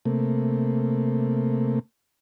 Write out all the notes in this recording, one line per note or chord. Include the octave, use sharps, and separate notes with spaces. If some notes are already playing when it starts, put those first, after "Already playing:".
C3 A3 A#3